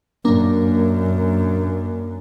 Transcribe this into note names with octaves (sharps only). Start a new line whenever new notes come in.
F#2 A#3 D4 A#4